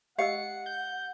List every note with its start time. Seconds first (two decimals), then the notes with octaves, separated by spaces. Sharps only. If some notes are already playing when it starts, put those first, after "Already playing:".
0.18 G4 D#5 F5 F#5 E6 C#7
0.66 G6